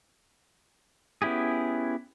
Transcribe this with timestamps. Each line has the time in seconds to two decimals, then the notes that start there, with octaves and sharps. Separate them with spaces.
1.22 B3 C#4 E4 G4 G#4